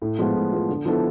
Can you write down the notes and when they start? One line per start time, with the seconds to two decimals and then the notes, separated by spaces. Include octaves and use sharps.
0.02 A2
0.19 F3 G#3 B3 F4
0.35 A2
0.52 F3 G#3 B3 F4
0.69 D3
0.85 F3 B3 E4 A4